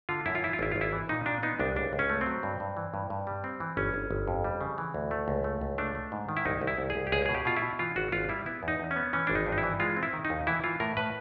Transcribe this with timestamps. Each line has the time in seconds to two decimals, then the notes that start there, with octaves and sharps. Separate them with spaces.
0.09 D3 F4
0.26 F#2 E4
0.35 F4
0.43 E3 E4
0.53 F4
0.59 G#1 E4
0.72 F4
0.76 G#1
0.81 E4
0.93 E3
1.09 A#2 D#4
1.26 A#2 D4
1.43 B3 D#4
1.60 C2 D4
1.76 C#2 D4
1.93 C#2
1.99 C#4
2.09 A3
2.21 C4
2.26 F#3
2.43 G2
2.60 G2
2.77 E3
2.94 G2
3.10 G2
3.27 G3
3.44 C4
3.60 E3
3.77 G1 C#4
3.94 G1
4.11 G1
4.28 F2
4.44 G3
4.61 C#3
4.78 E3
4.94 D2
5.11 A3
5.28 C#2
5.44 A3
5.61 C#2
5.78 A3 D4
5.95 A3
6.12 G#2
6.29 D#3
6.37 E4
6.45 C2 D#4
6.61 C2
6.67 E4
6.78 C2
6.90 G#4
6.96 C2
7.07 G4
7.12 C#2 G#4
7.26 B2 G#4
7.35 G4
7.45 B2 F4
7.57 E4
7.62 B2
7.79 E3 F4
7.96 G#1 F#4
8.12 G#1 F4
8.29 G3 E4
8.46 B3 E4
8.63 E2
8.68 D#4
8.80 E2
8.91 C#4
8.96 B3
9.13 E3 C#4
9.27 G#1 D4
9.35 D#4
9.46 G2
9.52 D#4
9.58 E4
9.63 E3
9.80 G#3 F4
9.97 C4
10.03 E4
10.13 D#3
10.25 D#4
10.30 D#2
10.47 E3 E4
10.64 E3 F4
10.80 A2 A#4
10.97 A2 B4